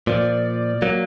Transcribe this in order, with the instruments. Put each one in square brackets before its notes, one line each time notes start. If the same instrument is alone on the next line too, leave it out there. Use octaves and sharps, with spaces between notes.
[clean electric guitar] A#2 F3 [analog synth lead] D5
[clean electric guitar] F#3 A#3